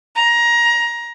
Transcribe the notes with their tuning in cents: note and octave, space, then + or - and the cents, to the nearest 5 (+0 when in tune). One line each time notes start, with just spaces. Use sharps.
A#5 +20